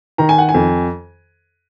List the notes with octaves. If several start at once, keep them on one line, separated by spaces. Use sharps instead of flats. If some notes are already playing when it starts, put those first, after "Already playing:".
D#3 A#5
G#5
F#5
G#5
F2